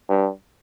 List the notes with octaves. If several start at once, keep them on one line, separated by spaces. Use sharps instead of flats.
G2